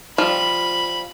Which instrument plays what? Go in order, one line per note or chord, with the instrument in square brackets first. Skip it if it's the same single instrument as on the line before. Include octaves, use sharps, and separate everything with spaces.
[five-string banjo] F3 G3 F4 [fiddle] B5